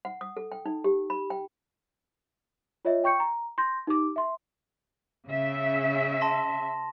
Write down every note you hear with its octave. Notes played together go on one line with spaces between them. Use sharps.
F#5
D#6
A4
G5
D#4
G4
B5
G5
F4 C#5 D#5 E5
G5 C#6 G6 C#7
A#5
C6 G6 A#6
D#4 G4 D6
E5 C6
C#3 E5
A5 C6 A#6